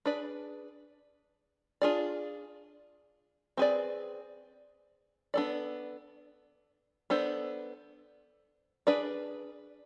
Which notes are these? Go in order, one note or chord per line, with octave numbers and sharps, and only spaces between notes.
D4 G#4 B4 D5
D4 F4 G#4 D5
C4 G#4 B4 D5
B3 D4 A4 D5
B3 D4 A4 C5
D4 G#4 B4 D5